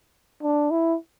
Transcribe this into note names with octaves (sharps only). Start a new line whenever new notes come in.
D4
E4